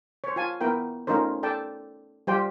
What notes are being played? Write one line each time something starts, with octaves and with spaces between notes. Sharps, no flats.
C5 C#5
F4 G#5 A5
B3 E4 A#4 G5
A3 C#4 D#4 F4 A#4 C5
A4 D5 G5 A5
G3 F4 G4 C5 G5